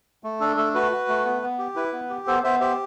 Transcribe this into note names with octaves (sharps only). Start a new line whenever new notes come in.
A3
D4 A4
A3 A4
F#4 B4
F#4
A3
B3
B3
G4
E4 B4
B3
G4
B3 A4 C5
B3 C5 E5
G4 C5 E5